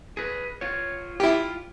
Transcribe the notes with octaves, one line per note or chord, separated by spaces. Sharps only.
G#4 B4
F4 C#5
E4 F4 G4